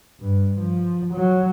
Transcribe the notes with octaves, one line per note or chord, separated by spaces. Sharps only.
G2
F3
F#3